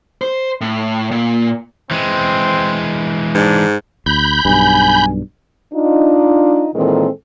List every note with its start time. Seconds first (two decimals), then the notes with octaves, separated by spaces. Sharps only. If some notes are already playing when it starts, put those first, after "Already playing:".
0.22 C5
0.61 A2
1.11 A#2
1.91 E3 G#3 C4
3.34 G#2 D4
4.06 D2 B5 G6
4.45 B1 G2 G#5
5.74 D4 D#4 F4
6.75 A#2 D#3 E3 G#3 C4 A4